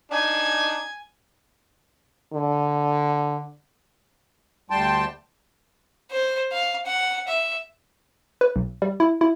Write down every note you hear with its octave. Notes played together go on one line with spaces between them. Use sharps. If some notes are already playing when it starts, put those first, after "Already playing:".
D4 D#4 G#5
D3
D2 G3 G5 A5 C6
C5
F5
F#5
E5
B4
B1
G3
E4
E4